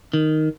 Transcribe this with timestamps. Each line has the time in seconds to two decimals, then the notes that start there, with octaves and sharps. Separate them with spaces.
0.13 D#3